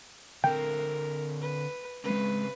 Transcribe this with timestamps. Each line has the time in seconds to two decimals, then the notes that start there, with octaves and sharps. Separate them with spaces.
0.44 D3 C4 A#4 G5
1.42 B4
2.04 C#3 G#3 C4 B4